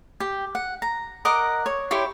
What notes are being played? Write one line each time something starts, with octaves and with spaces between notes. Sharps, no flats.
G4
F#5
A#5
A#4 D#5 F#5 D6
C#5
E4 G4 C#5 C6